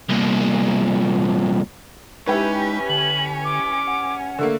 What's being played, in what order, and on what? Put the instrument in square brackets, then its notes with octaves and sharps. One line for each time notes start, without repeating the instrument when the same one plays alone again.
[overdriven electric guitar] C2 A#2
[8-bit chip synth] G#3 D#4 [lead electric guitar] C#4 [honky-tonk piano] E4 G4 B4
[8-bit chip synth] D3 [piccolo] F#7
[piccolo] D6
[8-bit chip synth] F#5
[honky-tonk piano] D3 A3 A#3